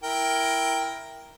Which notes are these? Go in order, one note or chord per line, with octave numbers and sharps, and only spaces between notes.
E4 A#4 G5